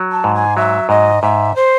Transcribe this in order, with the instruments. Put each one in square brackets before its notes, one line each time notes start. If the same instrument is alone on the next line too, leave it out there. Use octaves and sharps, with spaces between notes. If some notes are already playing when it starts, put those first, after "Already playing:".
Already playing: [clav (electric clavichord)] F#3
[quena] A5
[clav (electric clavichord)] G#2
[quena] G#5
[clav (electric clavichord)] F#3 [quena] E5
[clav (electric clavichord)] G#2 [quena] D#5
[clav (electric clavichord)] G#2 [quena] E5
[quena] C5